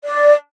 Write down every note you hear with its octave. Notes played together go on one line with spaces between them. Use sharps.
D5